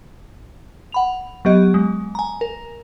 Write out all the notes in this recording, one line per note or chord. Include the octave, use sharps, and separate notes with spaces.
F#5 B5 F7
F#3 B3 G4 D#5
G#3
G#5 A#5
A#4